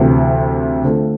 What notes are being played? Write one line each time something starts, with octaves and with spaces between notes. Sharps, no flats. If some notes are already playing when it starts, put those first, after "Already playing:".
Already playing: D2 C3 E3
D3 A3 C4 F4 A4